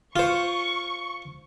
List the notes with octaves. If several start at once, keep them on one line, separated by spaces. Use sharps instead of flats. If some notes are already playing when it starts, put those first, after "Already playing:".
F4 C5 C#6